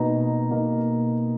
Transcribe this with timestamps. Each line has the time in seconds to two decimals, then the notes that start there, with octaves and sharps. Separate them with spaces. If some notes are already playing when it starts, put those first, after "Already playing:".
Already playing: B2 A#3 D#4 A#5
0.51 B2 A#3 D#4